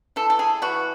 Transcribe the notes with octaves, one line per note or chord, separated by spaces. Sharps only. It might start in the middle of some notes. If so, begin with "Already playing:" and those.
E3 A4
A4
G#4
E3 F#4